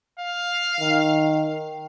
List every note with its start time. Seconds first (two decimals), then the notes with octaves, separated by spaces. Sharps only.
0.19 F5
0.80 D#3